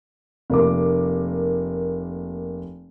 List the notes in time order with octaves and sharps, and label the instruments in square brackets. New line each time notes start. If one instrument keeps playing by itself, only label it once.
[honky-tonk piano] F1 A#3 D6